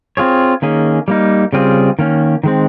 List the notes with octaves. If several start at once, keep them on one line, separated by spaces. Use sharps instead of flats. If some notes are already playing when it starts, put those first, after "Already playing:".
C4 F4 G#4 C#5
D#3 A#3 C#4 G#4
G3 A#3 D#4
C#3 G3 C4 F4 G#4
D#3 A#3 C#4
D#3 G#3 C4